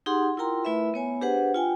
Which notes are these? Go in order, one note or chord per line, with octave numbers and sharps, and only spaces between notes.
D#4 G4 G#4 F#5 C6
E4 F4 A#4 G5 A#5 C6
A3 E4 B4 E5 B5
B3 C#5 G#5
D4 G4 G#4 B4 C5 F#5
F4 G5 G#5